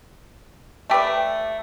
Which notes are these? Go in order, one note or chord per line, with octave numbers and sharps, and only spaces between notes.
A3 G4 B4 D5